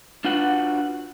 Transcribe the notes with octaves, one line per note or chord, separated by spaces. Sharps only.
D4 F4 F#4 B4 F#5